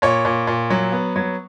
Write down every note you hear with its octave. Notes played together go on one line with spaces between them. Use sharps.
A#2 C#5
A#2
A#2
F#3
B3
F#3